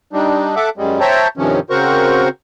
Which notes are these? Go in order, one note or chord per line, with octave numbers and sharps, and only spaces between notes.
G3 D4 D#4
A4 E5 F#5 D6
F#2 G3 G#3
C5 C#5 E5 G5 A5 A#5
G2 C3 D#3 F3 C#4
C#3 C4 F#4 A#4 C5 C#6